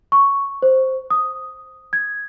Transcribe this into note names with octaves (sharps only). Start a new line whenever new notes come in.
C#6
C5
D#6
G#6